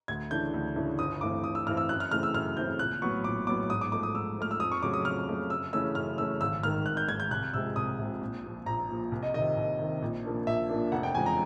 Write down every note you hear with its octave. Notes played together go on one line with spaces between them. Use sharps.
D2 G#6
C#3 E3 A3 D4 G6
D2
C#3 E3 A3 D4
G1 D#6
G2 E3 A3 C4 D6
G1 D#6
E6
G2 E3 A3 C4 F6
E6
F#2 F#6
F6
C#3 E3 A3 C4 F6
E6
F#2 F6
C#3 E3 A3 C4 G6
A#1 F#6
A2 F#3 B3 C#6
A#1 D6
A2 F#3 B3 D6
G#2 D#6
D6
F3 A3 D6
D#6
G#2 E6
F3 A3 F6
E6
F2 D#6
C#6
C#3 F#3 A3 D6
D#6
F2 F6
C#3 F#3 A3
F#2 E6
C#3 E3 A3 C#4 E6
F#2 F6
C#3 E3 A3 C#4 E6
G#1 E6
G#2 D#3 F6
G#1 F#6
G6
G#2 D#3 G#6
G6
C2 F#6
C3 F3 G#3 E6
C2 D#6
C3 F3 G#3
A#1
A#2 F3
A#1 A#5
A#2 F3
C2
D#5
C3 D#3 D#5
C2
C3 D#3
A#1
A#2 F3 A#3 D4
A#1 E5
A#2 F3 A#3 D4
F1 F#5
G5
E2 C#3 F3 G#3 G#5
A#5